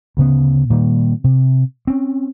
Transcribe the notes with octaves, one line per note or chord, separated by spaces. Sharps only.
D2 C#3 B3
A#2 D#3 G3
C3
C4 C#4